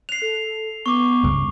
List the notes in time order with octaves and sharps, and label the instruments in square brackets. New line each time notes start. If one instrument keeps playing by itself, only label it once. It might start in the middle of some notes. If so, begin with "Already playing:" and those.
[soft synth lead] F#6 [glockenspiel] C7 F7
[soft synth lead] A4
[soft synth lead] B3 [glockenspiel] C#6 D6
[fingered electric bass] C#2 G2